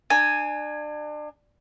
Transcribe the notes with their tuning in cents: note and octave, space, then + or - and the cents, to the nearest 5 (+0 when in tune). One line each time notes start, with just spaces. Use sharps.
D4 +35 G#5 +0